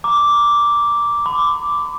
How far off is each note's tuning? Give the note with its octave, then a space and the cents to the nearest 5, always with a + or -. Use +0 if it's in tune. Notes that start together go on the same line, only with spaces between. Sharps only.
A#5 +10 D6 -5
B5 +45 D6 +0